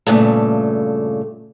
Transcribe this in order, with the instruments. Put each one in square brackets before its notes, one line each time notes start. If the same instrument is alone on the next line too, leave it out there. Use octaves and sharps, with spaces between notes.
[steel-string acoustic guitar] G2 A#2 C#3 A3